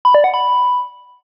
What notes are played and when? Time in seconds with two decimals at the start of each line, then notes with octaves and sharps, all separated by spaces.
0.05 B5
0.15 D5
0.24 F#5
0.34 B5